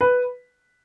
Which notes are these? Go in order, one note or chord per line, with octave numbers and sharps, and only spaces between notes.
B4